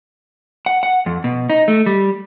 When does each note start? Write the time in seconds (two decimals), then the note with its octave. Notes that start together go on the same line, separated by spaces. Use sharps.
0.66 F#5
0.83 F#5
1.06 F2
1.24 B2
1.50 D#4
1.68 A3
1.86 G3